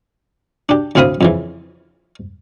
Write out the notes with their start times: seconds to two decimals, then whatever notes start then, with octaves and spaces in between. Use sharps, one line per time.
0.69 D4 G4
0.95 D2 A2 C4 F5 B5 D#6
1.21 F2 C#3 E3